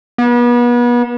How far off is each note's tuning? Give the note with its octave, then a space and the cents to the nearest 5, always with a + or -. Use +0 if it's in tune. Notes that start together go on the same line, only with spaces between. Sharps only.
B3 -35